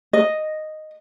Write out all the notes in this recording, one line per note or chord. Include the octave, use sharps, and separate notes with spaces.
D#5